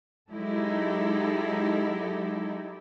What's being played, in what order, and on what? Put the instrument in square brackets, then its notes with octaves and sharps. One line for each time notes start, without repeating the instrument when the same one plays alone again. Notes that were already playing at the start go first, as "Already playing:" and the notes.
[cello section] F#3 G#3 D#4 E4 G4 A4